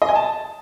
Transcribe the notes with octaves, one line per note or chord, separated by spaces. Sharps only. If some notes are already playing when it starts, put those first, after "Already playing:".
D#5
G#5
A5